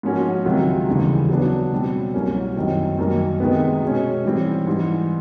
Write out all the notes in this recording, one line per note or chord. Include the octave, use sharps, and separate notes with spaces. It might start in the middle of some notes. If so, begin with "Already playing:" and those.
G#2 F3 A#3 C#4 F#4
C#2 C3 D#3 F#3
D#2 C#3 E3 G3
F#3 B3 D4
B2 G3 C4
C2 B2 F#3 A#3 C#4
F#2 D#3 G3 C4
F#2 D#3 G3 A#3
C3 D#3 G#3 B3
B2 G#3 C#4
G#2 E3 G3 C4
G#2 E3 G3